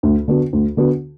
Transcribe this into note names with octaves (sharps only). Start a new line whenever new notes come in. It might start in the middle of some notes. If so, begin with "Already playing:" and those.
D2
D3 B3 F#4
D2
D3 B3 F#4